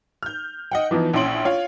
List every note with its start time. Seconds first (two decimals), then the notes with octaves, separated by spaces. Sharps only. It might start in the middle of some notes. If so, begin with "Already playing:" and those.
0.23 F6 G6
0.71 D#5 F#5 G5
0.91 E3 F3 B3 D#4
1.13 A#1 C#4 E4 C6 D7 F#7
1.45 F4 C#5 F5